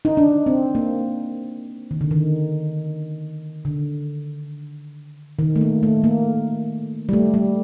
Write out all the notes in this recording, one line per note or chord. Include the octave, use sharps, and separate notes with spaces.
D#4
D4
C4
A#3
D#3
D3
D#3
D3
D#3
A3
A#3
A3
A#3
G3
A3
G3